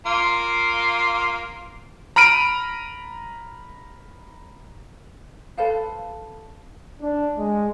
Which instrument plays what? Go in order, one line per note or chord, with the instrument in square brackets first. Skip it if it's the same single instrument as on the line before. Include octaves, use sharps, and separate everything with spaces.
[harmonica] A#3 F4
[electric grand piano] A#5 B5 F6 D7 D#7
[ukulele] A4 B4 C5 F5
[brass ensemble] D4
G#3